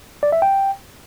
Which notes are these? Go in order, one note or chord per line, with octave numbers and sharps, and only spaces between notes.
D5
E5
G5